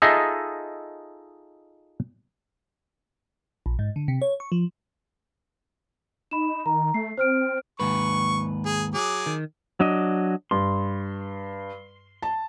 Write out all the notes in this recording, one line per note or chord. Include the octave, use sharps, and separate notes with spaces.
D#4 F4 G#4 A4 D#5 E5
A#1
G#2
D3
C3
C#5
C#6
F3
D#4 B5 E7
D#3 A#5
A3 C7
C4 C5 F6 D7
D#2 G#2 B4 C#6
G#4
F#3 G#4 D6
D#3
F#3 D4 D#5
G2 C6
A5